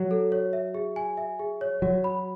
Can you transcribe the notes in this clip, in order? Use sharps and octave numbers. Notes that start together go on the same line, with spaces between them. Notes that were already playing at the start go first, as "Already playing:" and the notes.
Already playing: F#3
A4
C#5
E5
G#4
G#5
E5
G#4
C#5
F#3 F#4
B5